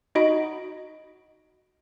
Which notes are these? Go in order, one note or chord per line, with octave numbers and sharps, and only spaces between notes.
D#4 F#4 D#5 B5 D7